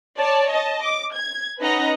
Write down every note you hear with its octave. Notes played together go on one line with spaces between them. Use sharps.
C#5 D5 A5
D#5 A5
D6
G#6
C#4 D#4 B4 D#5 F#5 A#5